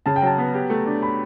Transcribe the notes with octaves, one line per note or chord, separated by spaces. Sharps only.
C#3 A5
G5
F#3 A5
B3
G4
A3
D4
B5